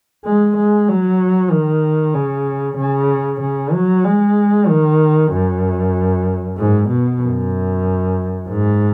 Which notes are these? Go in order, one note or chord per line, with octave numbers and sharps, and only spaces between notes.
G#3
G#3
F#3
D#3
C#3
C#3
C#3
F#3
G#3
D#3
F#2
G#2
B2
F#2
G#2